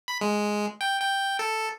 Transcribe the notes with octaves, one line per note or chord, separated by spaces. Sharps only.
B5
G#3
G5
G5
A4